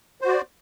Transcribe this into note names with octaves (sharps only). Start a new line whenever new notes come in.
F#4 C5 D5